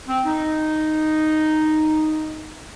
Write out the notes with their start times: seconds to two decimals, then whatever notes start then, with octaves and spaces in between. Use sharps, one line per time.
0.08 C4
0.25 D#4